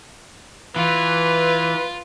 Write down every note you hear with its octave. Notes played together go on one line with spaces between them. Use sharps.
E3 F4 B4